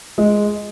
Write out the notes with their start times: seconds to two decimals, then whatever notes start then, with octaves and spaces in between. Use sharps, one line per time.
0.18 G#3